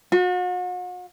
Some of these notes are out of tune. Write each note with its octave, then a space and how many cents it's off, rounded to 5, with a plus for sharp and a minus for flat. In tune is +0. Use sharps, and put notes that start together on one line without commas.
F#4 -40